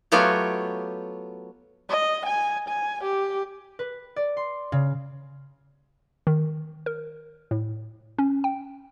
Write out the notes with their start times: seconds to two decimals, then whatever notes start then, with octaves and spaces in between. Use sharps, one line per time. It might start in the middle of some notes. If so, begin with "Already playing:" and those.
0.12 F#3 A3 B3 F4 G4 C#5
1.90 D#5
2.26 G#5
2.69 G#5
3.04 G4
3.79 B4
4.16 D5
4.37 C6
4.72 C#3
6.27 D#3
6.86 A#4
7.51 A2
8.19 C#4
8.44 G5